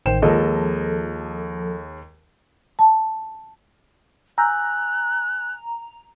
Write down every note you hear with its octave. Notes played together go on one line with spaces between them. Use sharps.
A1 D#3 C5 G5 E7
D#2 F3 G#3 A4 D#5
A5
G#5 A#5 E6 F#6 G6